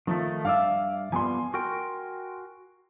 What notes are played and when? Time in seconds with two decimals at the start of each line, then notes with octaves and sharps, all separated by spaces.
0.07 D#3 F3 A3
0.45 G2 D5 E5 F5
1.12 F3 G3 B3 G#5 C6
1.54 F#4 A#4 G5